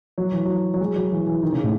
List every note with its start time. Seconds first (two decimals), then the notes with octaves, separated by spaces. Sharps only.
0.18 F#3
0.32 E3
0.45 F#3
0.74 F#3
0.80 G#3
0.96 F#3
1.11 E3
1.27 E3
1.43 D#3
1.52 C#3
1.63 A2